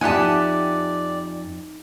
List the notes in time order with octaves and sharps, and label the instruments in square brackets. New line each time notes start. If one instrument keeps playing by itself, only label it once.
[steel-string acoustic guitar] F2 A5 [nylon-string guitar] D#4 E5 [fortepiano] G4 F#5 G#5 [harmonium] D5